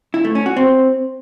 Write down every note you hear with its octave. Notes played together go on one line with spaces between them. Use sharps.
E4
A3
C#4
F#4
C4